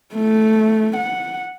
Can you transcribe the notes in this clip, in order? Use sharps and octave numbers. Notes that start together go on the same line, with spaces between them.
A3
F#5